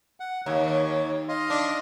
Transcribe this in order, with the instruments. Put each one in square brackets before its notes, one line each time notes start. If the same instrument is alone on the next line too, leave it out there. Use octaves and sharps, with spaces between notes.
[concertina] F#5
[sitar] D#2 [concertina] C#5
[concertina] D#5 F5 C6
[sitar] D4